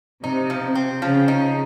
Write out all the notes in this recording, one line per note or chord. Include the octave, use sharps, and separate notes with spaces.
C3 D#4
F3
C4
C#3 F3
D#4